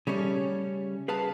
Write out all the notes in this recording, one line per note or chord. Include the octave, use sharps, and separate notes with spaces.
C#3 G3 A3 C#4
G#4 B4 F5 A5